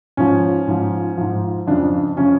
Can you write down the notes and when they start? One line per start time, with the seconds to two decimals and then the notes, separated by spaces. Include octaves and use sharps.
0.17 G#2 F3 C#4
0.67 G#2 F3
1.17 G#2 F3
1.67 F2 C#3 F3 D4
2.17 C#3 F3 C#4